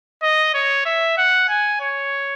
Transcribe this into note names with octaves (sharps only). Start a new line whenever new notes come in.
D#5
C#5
E5
F#5
G#5
C#5